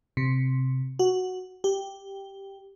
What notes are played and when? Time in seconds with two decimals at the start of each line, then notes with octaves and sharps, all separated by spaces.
0.17 C3
0.99 F#4
1.64 G4